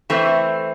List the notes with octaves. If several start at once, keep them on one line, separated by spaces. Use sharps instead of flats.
E3 A3 C4